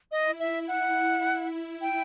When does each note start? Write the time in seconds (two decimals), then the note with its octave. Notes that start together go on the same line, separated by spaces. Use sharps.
0.11 E4 D#5
0.40 E5
0.68 F#5
1.81 G5